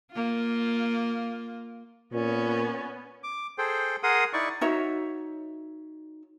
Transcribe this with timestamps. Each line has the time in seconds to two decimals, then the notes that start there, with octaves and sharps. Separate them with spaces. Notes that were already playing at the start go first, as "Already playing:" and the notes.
0.12 A#3 F4
2.13 A#2 B3 C#4
3.23 D6
3.58 G#4 A4 C5 G5
4.03 G#4 A#4 F#5 C6 D#6
4.33 D#4 E4 D5 C#6
4.61 D#4 F#4 C#5 E5